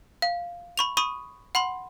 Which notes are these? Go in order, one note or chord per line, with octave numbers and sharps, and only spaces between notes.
F5
B5 C#6 F7
B5 C#6 D#6 D#7
F#5 B5 C6